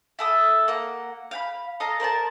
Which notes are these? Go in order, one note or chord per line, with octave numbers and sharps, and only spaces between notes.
E4 A4 D#6
A#3 F#5
F5 G5 B5
A4 D#5 F5 A#5
A#4 C5 D5 A5